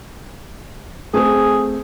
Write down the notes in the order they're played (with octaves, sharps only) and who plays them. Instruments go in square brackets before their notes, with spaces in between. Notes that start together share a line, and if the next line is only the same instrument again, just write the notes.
[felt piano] A3 C4 C5 [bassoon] G#4